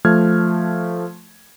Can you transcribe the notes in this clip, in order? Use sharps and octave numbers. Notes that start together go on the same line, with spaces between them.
F3 A3 F6 G#6